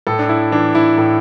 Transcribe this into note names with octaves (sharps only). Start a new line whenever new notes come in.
A2 A4
D4
E4
E3 D4
E4
A2